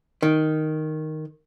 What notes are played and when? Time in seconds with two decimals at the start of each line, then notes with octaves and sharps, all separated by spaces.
0.23 D#3